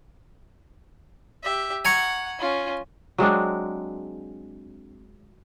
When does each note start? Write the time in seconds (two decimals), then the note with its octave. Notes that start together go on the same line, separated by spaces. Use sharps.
1.43 G4 E5
1.85 F#5 G#5 A#5 C#6
2.39 C#4 F4
3.18 F#3 G#3 C4 D4